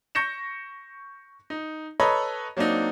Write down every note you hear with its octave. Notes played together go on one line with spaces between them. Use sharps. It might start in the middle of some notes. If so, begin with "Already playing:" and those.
C#6 G6 A#6 C#7 E7
D#4
A4 B4 C#5 D#5 A#5 B5
F#3 A#3 C4 D4 D#4